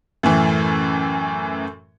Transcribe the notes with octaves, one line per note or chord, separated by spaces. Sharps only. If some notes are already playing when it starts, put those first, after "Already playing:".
F#2 A2 E3